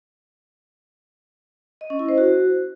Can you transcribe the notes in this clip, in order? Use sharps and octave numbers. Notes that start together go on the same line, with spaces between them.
D#5
C#4
E4
C5
F#4